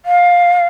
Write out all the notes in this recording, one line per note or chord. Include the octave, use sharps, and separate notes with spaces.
F5